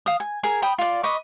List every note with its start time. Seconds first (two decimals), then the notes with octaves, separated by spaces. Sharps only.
0.06 F5 D#6
0.20 G#5
0.43 G#4 A#4 G#5
0.62 G5 B5 D#6
0.78 F4 D5
1.03 B4 D#5 C#6 D6